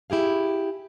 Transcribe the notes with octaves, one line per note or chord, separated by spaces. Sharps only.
E4 G4 G#4 F5